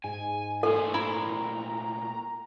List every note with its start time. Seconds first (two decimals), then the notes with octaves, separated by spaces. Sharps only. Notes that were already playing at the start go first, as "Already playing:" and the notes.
0.04 G#2 G#5
0.63 A#2 A3 A4 C5 G#5
0.94 E4 A#5